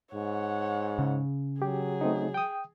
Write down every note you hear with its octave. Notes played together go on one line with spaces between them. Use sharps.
G#2 C#5 F#5
C#3
F#3 G4 G#4
A3 C4 D#4
G5 D#6